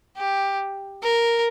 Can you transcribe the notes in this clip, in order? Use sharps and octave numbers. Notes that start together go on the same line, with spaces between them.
G4
A#4